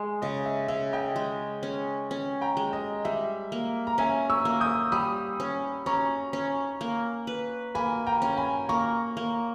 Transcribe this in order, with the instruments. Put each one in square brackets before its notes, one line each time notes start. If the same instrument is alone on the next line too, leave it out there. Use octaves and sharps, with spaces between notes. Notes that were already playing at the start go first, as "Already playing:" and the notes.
Already playing: [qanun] G#3
[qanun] C#3 [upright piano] D#5
[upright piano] E5
[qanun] C#3 [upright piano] E5
[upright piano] D#5 G5
[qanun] G#3
C#4
C#4
[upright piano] G5 A#5
[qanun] G#3
[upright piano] D#5
[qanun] G3 [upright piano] E5
[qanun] A#3
[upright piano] A#5
[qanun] C#4 [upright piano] E5 G#5
[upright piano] C#6 E6
[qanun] A#3
[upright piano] D#6 G6
[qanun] G3 [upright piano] B5 D#6
[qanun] C#4
[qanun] C#4 [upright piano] A#5 C#6
[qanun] C#4
A#3
B4
[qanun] A#3 [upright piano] G#5 B5
[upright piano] G5 A#5
[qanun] C#4
[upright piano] G#5 B5
[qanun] A#3 [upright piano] A#5 C#6
[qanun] A#3